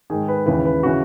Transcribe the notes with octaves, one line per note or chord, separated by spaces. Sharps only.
G#2 D#3 G#4
B4
D#2 C#3 E3 B4
B4
C#3 E3 F#4